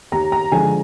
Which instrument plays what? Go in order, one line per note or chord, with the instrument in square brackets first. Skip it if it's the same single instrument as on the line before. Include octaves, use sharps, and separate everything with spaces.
[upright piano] D#2 A#5
A#5
D3 F3 G#3 G#5